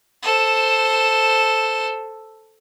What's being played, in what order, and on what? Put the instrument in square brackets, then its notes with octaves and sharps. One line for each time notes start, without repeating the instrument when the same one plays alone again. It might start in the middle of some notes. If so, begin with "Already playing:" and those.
[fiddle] A4 C5